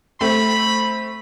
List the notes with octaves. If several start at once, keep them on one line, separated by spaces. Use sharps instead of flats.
A3 C4 B5